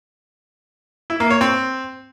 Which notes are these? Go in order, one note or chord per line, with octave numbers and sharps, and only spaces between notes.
E4
A#3
C#5
C4